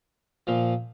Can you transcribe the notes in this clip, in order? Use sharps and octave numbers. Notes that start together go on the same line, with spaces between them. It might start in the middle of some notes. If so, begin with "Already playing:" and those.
A#2 F3